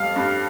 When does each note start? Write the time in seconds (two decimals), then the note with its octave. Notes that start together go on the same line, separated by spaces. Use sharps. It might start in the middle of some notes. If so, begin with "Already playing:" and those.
Already playing: F2 G3 F5
0.16 G2